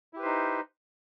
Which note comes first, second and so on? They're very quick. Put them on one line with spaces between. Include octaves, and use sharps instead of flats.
E4 G4 B4 C5 D#4